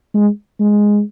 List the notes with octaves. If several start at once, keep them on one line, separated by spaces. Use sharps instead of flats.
G#3
G#3